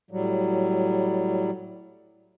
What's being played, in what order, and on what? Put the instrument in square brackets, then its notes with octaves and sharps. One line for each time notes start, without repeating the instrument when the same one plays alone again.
[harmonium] A2 F#3 G3